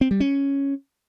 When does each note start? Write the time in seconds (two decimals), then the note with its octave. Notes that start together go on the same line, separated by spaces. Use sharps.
0.01 C4
0.11 G3
0.20 C#4